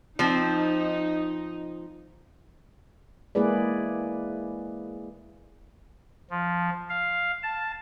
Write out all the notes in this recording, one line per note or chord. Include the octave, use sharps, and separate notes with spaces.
F3 C4 D#4
G#3 A#3 E4 G#4 B4 D5
F3
F5
A5